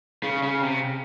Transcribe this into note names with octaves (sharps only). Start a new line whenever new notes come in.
C#3
C#3
C3